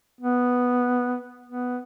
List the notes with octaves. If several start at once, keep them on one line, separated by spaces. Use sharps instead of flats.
B3
B3